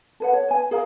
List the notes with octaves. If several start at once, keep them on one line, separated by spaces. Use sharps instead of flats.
A4 B4 F#5
C#5
B4 G#5
G#4 A#4 F5 A#5